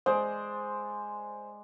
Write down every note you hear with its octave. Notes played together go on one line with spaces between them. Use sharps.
G#3 C5 D5